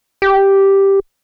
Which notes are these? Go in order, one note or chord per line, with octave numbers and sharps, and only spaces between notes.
G4